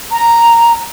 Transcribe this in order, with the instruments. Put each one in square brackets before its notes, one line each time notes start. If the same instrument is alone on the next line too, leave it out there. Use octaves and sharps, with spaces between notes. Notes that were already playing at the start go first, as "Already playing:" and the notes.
[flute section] A#5